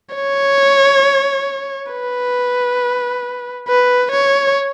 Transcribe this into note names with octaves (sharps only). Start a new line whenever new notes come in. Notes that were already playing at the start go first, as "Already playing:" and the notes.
C#5
B4
B4
C#5